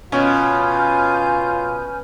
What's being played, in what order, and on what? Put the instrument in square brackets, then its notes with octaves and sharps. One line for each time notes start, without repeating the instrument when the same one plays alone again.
[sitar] B2 [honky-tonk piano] C#4 [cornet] F4 [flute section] G#5 F6 G6